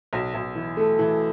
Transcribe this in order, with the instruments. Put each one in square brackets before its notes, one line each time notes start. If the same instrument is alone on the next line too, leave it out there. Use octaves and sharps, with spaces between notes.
[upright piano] B1
B1
E3
A3
E3